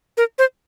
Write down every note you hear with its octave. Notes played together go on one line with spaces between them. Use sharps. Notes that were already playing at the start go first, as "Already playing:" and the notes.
A#4
C5